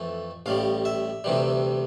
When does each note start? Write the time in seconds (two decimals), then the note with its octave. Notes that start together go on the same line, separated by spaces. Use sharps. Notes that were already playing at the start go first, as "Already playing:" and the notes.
Already playing: F2 E3 A3
0.46 A1 A2 G3 F5
0.85 E5
1.24 D2 C3 E3 G3